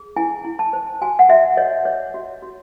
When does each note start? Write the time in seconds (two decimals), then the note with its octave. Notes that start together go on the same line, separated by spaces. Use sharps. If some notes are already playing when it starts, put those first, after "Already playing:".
Already playing: G#4
0.16 E4 G#5
0.45 E4
0.59 A5
0.73 C5
1.01 F#4 G#5
1.19 F#5
1.29 F#4 E5
1.57 C#5 D#5
1.85 C#5
2.14 F#4
2.42 F#4